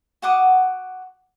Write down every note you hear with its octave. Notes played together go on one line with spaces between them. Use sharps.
F#4 F#5 D6 D#6